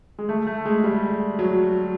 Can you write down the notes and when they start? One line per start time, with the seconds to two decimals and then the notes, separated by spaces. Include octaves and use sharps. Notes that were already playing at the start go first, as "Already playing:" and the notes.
0.19 G#3
0.29 A3
0.47 A3
0.65 G#3
0.84 G3
1.39 F#3